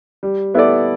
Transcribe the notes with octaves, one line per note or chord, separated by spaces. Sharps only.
G3
B3 E4 A4 D5